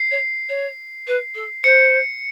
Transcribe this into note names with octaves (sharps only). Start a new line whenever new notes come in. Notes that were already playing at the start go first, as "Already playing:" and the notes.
Already playing: C7
C#5
C#5
B4
A4
C5 C#7